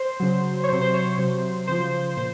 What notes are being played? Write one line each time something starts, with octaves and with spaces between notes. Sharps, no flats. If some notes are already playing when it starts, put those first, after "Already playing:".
Already playing: C5
C#3 F#3
C#5
C3 F#3 C5
C5
C#5
C5
C3 F#3
C#3 F3 C5
A#2 C5